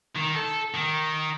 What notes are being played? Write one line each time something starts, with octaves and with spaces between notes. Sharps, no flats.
D#3
A4
D#3